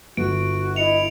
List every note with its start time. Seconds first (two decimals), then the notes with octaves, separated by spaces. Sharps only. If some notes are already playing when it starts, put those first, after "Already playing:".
0.17 G1 F#4 D7
0.76 E4 D#5 C#7 F7